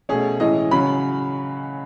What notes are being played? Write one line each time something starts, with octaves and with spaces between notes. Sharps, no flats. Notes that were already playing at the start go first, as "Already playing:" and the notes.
B2 A3 C#4 G#4
A2 E3 G#3 C#4 D#5
C#3 F#3 C#4 B5